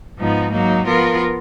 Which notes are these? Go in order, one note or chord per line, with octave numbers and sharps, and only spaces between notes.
G#2 F3 B3 D#4
F#3 A#3 D#4
F3 B3 F4 A#4